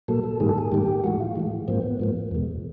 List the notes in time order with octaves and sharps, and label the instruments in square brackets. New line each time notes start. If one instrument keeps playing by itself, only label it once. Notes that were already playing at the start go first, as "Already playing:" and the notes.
[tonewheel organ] A#2 F#3 A#3 A4
A4
G#2 D#3 G3 A#3 G#4
A4
G#4
G#2 D#3 G3 A#3 G4
A2 E3 G#3 F#4
F4
A2 E3 G#3
G#2 F3 A#3 C4
B3
G#2 F3 A#3
E2 B2 G#3